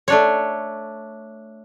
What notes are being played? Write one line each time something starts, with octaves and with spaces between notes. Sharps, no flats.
A3 D4 C#5